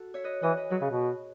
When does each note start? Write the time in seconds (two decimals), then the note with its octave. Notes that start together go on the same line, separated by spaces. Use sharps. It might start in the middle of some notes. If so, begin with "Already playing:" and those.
Already playing: F#4 A4
0.14 C#5 E5
0.24 B4 D#5
0.42 E3 B4 D#5
0.57 B4 D#5
0.70 F#3 G#4 B4
0.81 C#3
0.90 B2